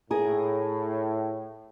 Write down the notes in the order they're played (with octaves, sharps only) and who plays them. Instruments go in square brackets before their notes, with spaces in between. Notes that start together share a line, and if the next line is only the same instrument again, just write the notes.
[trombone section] A2 [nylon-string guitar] G#4 A#4